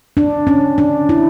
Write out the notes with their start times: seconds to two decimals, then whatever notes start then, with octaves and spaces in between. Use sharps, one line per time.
0.17 D4
0.47 C#4
0.78 D4
1.09 E4